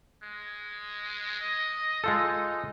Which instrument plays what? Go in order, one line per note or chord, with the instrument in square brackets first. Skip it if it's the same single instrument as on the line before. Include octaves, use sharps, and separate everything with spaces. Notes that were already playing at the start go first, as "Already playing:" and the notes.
[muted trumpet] G#3
D#5
[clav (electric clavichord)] G#3 F4 A4 [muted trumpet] D#4